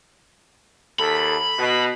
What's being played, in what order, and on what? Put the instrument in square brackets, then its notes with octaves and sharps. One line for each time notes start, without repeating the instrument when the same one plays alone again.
[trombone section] D#2 A4 [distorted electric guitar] B5
[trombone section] B2